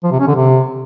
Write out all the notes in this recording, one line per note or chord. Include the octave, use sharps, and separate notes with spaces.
F3
C3
C#4
D3
C3